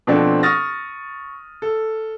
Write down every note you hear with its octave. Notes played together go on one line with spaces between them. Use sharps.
B2 F3 C4 D4 A4
C#6 D#6 F6 A6 A#6
A4